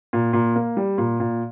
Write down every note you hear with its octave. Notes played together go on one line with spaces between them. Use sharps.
A#2
A#2
A#3
G3
A#2
A#2